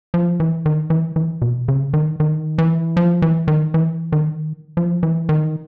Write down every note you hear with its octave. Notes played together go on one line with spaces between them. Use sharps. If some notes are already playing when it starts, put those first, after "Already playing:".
F3
E3
D#3
E3
E3
B2
C#3
D#3
D#3
E3
F3
E3
D#3
E3
D#3
F3
E3
D#3